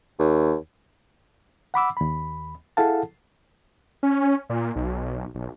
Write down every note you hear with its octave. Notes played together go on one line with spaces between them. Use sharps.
D#2
F#5 B5 D6 E6
D#2 B5
E4 G#4 A4 F5 F#5 A5
C#4
A#2
B1
B1